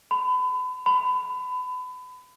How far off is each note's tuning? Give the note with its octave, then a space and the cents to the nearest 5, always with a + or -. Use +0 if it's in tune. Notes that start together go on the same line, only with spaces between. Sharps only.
B5 +35
B5 +30